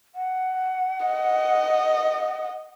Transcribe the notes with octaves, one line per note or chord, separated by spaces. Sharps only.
F#5
D#5